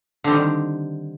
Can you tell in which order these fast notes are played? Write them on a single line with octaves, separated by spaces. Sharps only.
D3 C4 G3 D#3